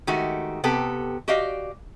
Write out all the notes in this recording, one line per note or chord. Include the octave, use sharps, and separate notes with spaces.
D#3 G#3 A3 F#4 G4
C3 B3 G4 A4
F#4 G4 D5 D#5 F5